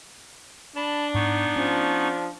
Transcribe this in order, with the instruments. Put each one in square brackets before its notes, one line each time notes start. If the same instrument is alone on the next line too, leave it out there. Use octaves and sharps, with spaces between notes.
[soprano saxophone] D4 [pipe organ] A5 B5
[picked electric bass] G#2 [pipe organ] B3 D#4 C#6
[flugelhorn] F3 [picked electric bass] C#4